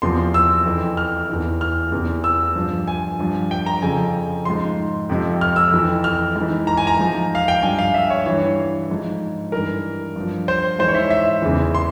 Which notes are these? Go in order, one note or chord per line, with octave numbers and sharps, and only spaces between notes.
E2 C3 F3 C6
E6
F2 E3
F6
E2 E3
F6
E2 C3 E3
E6
G2 F3
G#5
G2 F3
G5
A#5
F2 C#3 F3 G#5
G#2 F3 C6
F2 C3 F3
F6
E6
F2 E3
F6
G#2 E3
A#5
G#5
A#5
G#2 F3
F5
G5
G2 F3 G#5
F5
E5
C#5
G2 E3 C#5
G#2 F3
G2 E3 A#4
G2 F3
C5
G#2 E3 C5
C#5
E5
E5
E2 C#3 E3
C6